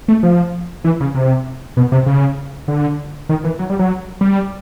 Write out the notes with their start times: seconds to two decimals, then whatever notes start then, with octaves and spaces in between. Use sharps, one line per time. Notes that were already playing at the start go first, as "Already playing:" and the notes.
0.08 A3
0.23 F3
0.84 E3
1.01 C#3
1.15 C3
1.77 B2
1.92 C3
2.06 C#3
2.68 D3
3.29 D#3
3.44 E3
3.59 F#3
3.70 G3
3.79 F#3
4.21 G3